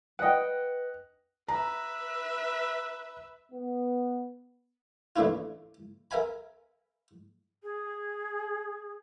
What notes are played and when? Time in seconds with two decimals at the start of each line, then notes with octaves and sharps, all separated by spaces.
0.19 B4 D#5 F#5 G5
1.48 B4 E5 A#5
3.52 B3
5.16 A1 D2 A3 D4 E4 F4
6.11 A#4 E5 F5 G#5 B5
7.62 G#4